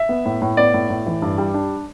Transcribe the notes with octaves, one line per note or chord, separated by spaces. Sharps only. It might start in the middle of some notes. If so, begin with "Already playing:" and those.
Already playing: E5
B3
A2
A2
B3 D5
A2
A2
E3
G2
G3
D4